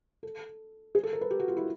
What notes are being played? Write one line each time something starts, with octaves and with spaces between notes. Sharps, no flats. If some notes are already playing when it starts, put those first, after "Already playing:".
A4
G#4
A4
A#4
B4
G4
F#4
F4
E4